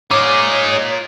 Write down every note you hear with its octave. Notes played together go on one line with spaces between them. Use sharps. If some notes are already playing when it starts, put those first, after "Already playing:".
D#4 F4 G#4 A#4 C#5 D6